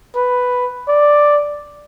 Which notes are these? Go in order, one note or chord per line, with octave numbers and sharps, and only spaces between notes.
B4
D5